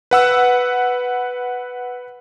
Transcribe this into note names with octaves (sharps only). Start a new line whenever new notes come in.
B4 F#5 E6